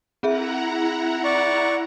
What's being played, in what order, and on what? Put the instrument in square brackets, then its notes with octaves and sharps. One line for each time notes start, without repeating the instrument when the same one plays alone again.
[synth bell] C4 G#4 E5 [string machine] E4 F#5 A#5
[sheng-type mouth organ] D5 C#6